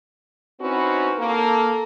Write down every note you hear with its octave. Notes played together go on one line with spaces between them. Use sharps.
C4 C#4 D#4 E4 F#4 B4
A#3 A4